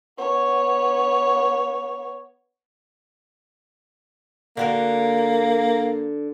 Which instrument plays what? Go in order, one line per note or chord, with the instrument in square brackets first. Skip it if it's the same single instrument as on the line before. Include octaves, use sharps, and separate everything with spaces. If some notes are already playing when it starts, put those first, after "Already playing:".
[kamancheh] B3 C#5
[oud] D3 F#4 A#4 [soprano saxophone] A#3